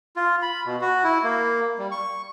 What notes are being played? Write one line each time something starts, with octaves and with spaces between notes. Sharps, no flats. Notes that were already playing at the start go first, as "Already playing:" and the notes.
F4
B5
B2
F#4
E4
A#3
G3
C#6